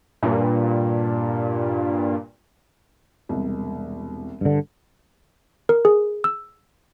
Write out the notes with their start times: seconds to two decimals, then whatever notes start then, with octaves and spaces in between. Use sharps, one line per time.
0.23 G2 A#2
3.29 E1 C2
4.41 G2 D3
5.69 A#4
5.85 G#4
6.24 E6